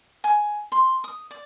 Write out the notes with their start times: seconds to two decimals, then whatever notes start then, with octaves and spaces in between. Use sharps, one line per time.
0.24 G#5
0.72 C6
1.04 D#6
1.31 D5